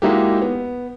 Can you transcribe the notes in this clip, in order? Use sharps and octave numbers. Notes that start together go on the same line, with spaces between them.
G#3 A#3 D#4 E4 F#4 G4
B3